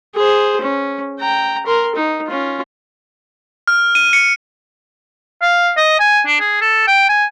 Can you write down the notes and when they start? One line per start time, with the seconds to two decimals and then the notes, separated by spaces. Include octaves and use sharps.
0.15 G#4 C5
0.62 C#4
1.20 G5 A#5
1.67 A#4 C6
1.96 D#4
2.27 C#4 F4
3.68 F6
3.95 D#7
4.13 C#7
5.42 F5
5.77 D#5
6.00 G#5
6.26 D4
6.40 G#4
6.61 A4
6.87 G5
7.09 G#5